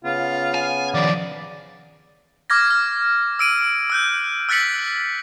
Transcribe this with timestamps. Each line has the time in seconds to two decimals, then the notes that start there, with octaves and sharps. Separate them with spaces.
0.04 C#3 B3 F4
0.54 G#5
0.94 D#3 F3 D5
2.50 D6 F6 G#6 A#6
2.70 F6
3.39 E6 D7 D#7
3.90 E6 F#6 G6
4.49 E6 F#6 A6 B6 C#7 F#7